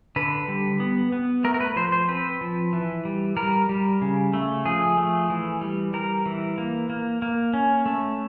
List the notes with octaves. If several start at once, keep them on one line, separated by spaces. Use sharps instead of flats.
D3 B4
G3
B3
B3
A3 A#4
A#4
B4
F3 C5
C5
C4 B4
F3
E3
G3
G3 A#4
G3
C#3
A3
F3 G#4
A3
E3
G3
G3 A#4
E3
A#3
A#3
A#3
C#4
A3